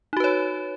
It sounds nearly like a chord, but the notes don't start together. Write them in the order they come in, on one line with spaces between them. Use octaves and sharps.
D#4 F#4 B4 C#5